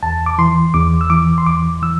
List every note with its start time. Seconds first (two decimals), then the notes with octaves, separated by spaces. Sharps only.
0.03 E2 A5
0.26 D6
0.38 E3 C6
0.74 E2 D6
1.01 E6
1.10 E3 D6
1.38 C6
1.46 E2 D6
1.82 E3 E6